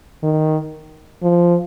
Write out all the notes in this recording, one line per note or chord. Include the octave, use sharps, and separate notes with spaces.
D#3
F3